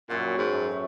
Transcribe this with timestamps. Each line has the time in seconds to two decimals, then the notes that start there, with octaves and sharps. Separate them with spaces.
0.09 F#2 A#2 F#5 A#5
0.23 G3
0.38 G#2
0.52 F#2 A4
0.71 B4 C#5 E5